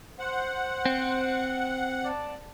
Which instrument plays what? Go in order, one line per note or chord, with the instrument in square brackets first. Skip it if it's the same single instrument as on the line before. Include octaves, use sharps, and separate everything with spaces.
[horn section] C5 [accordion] F#5
[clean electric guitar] C4
[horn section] D5 A5